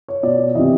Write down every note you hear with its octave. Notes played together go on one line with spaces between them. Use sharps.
C#5
B2 D5
C3 E3 D#5